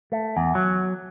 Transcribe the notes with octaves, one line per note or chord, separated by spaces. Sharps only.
A3
E2
F#3